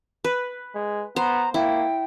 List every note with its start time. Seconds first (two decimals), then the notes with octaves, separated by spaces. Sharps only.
0.24 B4
0.75 G#3
1.16 B3 C5 A#5
1.54 A#3 E4 G5